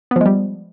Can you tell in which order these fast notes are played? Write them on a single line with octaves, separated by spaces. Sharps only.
B3 F3 G#3 G3